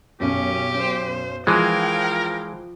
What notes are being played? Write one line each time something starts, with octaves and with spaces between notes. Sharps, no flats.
B1 F#2 C#4 G4
C5
E3 F3 G#3 A#4 F5 G5 F#6 D#7